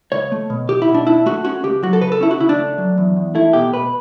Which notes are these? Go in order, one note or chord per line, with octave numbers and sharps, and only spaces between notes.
C#2 C#5
A3
B2
B2 G4
E4
B2
D4
D4 E4
A3 F#4
C#4 F#4
C#2 G4
F#3 F#4
A4
C#3 B4
A4
C#4 E4
F#4
C#3 E4
D4
A3
F#3
E2
E2
A3 E4
B2 G4
B2 B4